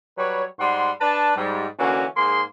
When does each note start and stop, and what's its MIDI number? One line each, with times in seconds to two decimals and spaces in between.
0.18 0.45 54
0.18 0.45 55
0.18 0.45 71
0.18 0.45 73
0.59 0.91 44
0.59 0.91 55
0.59 0.91 78
0.59 0.91 84
1.01 1.34 62
1.01 1.34 71
1.01 1.34 74
1.01 1.34 81
1.37 1.67 44
1.37 1.67 55
1.79 2.06 50
1.79 2.06 52
1.79 2.06 58
1.79 2.06 61
1.79 2.06 66
2.17 2.43 44
2.17 2.43 58
2.17 2.43 68
2.17 2.43 84